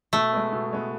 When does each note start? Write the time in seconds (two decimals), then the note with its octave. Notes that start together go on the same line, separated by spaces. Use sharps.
0.13 B2 A3
0.33 G#3 B3
0.53 B2
0.73 G#3 B3